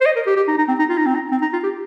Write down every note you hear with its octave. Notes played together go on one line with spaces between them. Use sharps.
C5
D#5
A#4
G4
G4
D#4
D#4
C4
D#4
F4
D#4
C4
D#4
C4
D#4
F4
G4